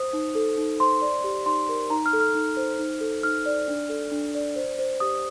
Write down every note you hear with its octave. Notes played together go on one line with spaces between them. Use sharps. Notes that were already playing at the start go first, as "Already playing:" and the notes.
Already playing: C5 D#6
D#4
A4
D#4
C5 C6
D5
G4
D#4 C6
A#4
D#4 A#5
F6
A4
F6
D#4
C5
D#4
A4
D#4 F6
D5
D4
A4
D4
D5
C5
C5
G4 D#6